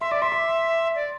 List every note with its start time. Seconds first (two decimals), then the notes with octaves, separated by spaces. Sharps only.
0.01 E5 C6
0.11 D5 D6
0.22 E5 C6
0.32 C6
0.95 D5